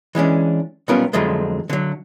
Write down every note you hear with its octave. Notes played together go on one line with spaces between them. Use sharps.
E3 G#3 C#4 D4
B1 G3 B3 C#4 F4 A#4
F2 D3 F3 F#3 G#3 A3
D3 F#3